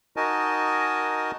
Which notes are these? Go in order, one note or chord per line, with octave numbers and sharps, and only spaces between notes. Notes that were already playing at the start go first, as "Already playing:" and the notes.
D#4 F#4 A#4 D#5 G#5 A5